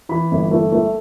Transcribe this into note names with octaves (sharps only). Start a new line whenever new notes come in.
E3 B5
G1
A3
A3